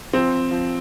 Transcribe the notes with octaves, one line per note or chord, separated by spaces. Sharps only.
F3 C4
F3